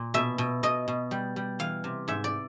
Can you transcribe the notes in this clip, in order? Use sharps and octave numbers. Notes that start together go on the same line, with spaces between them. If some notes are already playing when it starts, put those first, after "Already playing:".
Already playing: A#2
B2 E5
B2
B2 D#5
B2
G3
G3
E3 F5
C3
G#2 E5
D5